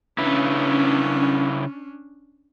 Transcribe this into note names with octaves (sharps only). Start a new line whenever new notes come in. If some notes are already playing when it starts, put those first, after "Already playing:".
C#3 C#4 D4 E4 B4